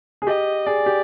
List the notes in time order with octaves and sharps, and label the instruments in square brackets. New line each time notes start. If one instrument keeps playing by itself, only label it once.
[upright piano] G#4
[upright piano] G4 [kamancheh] D#5
[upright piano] G#4 [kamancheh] D5
[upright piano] G4